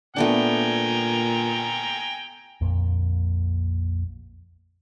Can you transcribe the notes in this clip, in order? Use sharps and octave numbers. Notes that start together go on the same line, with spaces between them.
A#2 A3 B3 D4 G5 G#5 A#5
A#1 F2 A#2 A#3